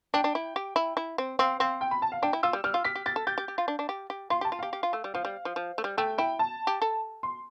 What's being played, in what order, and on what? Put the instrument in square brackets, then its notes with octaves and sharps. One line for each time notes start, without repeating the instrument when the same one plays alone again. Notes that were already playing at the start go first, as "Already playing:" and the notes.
[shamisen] D4 [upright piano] G5
[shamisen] D4
E4
G4
E4
E4
C4
[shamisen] C4 [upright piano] F5
[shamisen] C4 [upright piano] F5
[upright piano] G5
B5
A5
F5
[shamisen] D4 [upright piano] G5
[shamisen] E4
[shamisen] F4 [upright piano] E6
[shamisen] G3
[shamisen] G3 [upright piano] F6
[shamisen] F4
[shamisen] G4 [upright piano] B6
[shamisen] G4
[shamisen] G4 [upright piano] A6
[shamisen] A4
[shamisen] G4 [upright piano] G6
[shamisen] G4
G4
F4
D4
D4
G4
G4
[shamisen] F4 [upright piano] C6
[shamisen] G4 [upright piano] A5
[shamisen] F4
[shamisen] G4 [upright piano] F5
[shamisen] G4
F4
A3
G3
[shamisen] F3 [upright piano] F5
[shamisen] G3
F3
F3
A3
G3
[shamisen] A3 [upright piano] G5
[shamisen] E4 [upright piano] G5
[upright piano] A5
[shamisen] G4
A4
[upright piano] C6